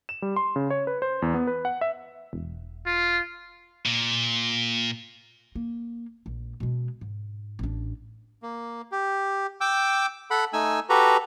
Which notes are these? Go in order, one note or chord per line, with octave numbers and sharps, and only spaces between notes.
E7
G3
C6
C#3
C#5
B4
C5
E2
B3
B4
F#5
E5
E1
F4
A#2
A#3
A#1
B2 G#3
G#2
A1 D4
A#3
G4
G5 D6 E6
A4 F#5 B5
A3 D#4 G#5 E6
F#4 G4 A4 B4 A#5